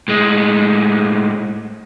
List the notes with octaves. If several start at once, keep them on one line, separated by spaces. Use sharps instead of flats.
A2 G#3